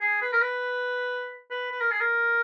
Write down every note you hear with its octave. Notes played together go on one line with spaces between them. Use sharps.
G#4
B4
A#4
B4
B4
B4
A#4
G#4
A#4